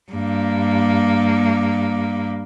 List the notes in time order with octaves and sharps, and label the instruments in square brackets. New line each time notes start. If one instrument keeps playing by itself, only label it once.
[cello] G2 A#3